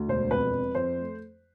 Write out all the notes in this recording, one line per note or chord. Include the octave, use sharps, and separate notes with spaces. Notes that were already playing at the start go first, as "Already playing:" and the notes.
Already playing: D2
E1 C5
F2 B4
F2
F2 C5
A3